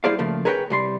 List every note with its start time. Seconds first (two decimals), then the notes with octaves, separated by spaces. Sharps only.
0.04 G3 E4 G#4 C5 D5 F5
0.19 C#3 F3 A3 A#3
0.45 G#4 A#4 B4 C#5 E5 G5
0.70 C2 G3 C6